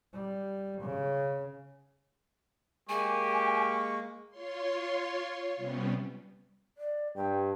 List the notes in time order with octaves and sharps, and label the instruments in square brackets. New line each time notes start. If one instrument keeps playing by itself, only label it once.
[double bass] G3
C#3
[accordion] G#3 A#3 [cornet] G4 [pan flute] G#5 [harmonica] C#6
[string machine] F4 C#5 C6
C3 G3 B3 C#4
[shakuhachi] D5
[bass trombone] G2 [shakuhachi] G5